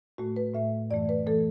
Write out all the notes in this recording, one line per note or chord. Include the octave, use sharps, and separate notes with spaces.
A2 A3 F#4
B4
A2 A3 E5
F#2 E3 A3 D5
B4
E3 A3 A4